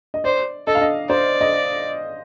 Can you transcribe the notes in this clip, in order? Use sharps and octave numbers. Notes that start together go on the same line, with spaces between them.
D#5
C5 D5
A4 D#5
F5
D#5
C5 D5
D#5